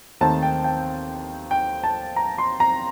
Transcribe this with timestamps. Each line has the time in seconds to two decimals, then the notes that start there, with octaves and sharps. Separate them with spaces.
0.21 D#2 D#3 A3 C4 A5
0.43 G5
0.64 G5
1.51 G5
1.83 A5
2.16 A#5
2.38 C6
2.60 A#5